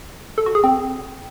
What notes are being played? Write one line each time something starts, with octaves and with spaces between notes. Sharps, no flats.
A4
F#4
G#4
C4